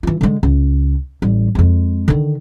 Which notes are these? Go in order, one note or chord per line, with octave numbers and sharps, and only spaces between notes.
E3 F4
D3 G#3
C#2
A1 G3
F2 G#3
D3 D#3